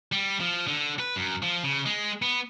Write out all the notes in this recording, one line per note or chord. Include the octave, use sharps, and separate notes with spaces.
G3
F3
D3
B4
F#2
F3
C#3
G#3
B3